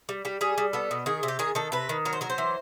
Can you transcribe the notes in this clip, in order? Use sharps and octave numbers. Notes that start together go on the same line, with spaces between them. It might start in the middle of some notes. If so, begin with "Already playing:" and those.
G3
G3 G4
G3 G#4
G3
B3 A4
B2
D#3 G#4
C3
G4
D#3 G#4
D#3 A4
C3 B4
D#3
F#3 A#4
C5
F#3 A#4
C5
E3